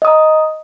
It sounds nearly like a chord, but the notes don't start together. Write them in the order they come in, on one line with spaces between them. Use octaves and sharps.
D#5 D#6 A#5